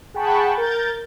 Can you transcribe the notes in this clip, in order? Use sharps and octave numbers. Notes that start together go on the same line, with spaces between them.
G#4 F#5 G5 A5 B5 C#6
A#4 G6 A6